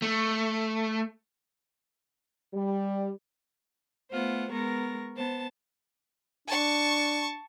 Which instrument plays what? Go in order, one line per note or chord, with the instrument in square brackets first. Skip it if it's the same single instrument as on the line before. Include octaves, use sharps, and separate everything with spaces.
[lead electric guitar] A3
[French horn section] G3
[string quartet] A3 B3 F4 C5 F#5
G#3 B3 A#4 C#6 A#6
B3 C5 A5
[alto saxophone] D4 [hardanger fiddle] A5 C#6